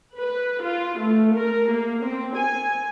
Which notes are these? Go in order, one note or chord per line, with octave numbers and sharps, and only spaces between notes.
B4
F4
A3
A#4
A#3
C4
G#5